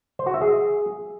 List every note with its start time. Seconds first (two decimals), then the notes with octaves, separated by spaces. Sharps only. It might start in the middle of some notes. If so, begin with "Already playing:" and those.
0.19 C5
0.27 F#4
0.34 E5
0.41 G#4